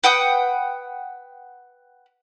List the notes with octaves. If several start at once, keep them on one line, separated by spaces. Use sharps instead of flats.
B4 F#5 G5 D#6